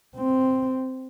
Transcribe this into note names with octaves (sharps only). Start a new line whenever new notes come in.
C4